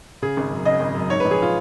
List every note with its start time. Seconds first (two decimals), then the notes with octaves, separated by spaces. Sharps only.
0.22 C#3 G#4
0.37 G#1
0.51 F#2
0.65 C#3 D#5
0.80 G#1
0.95 F#2
1.10 G#2 C#5
1.20 B4
1.25 A#1
1.31 G#4
1.42 F4